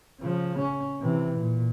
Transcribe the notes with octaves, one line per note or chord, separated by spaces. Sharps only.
C#3 F3
C#4
C3 E3
A#2